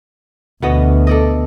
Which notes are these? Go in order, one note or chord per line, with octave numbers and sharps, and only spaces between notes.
D2 B2 B3 D#5
A4 D5 D#5